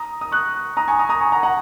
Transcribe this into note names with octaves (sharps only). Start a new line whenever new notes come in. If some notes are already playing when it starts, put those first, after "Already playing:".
Already playing: A#5 D#6
D#6
C#6 F#6
A#5 D#6
G#5 C#6
A#5 D#6
A#5 D#6
G#5 C#6
F#5 A#5
F#5 A#5